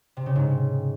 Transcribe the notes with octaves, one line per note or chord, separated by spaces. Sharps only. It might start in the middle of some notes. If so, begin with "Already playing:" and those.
C3
C#3
G#2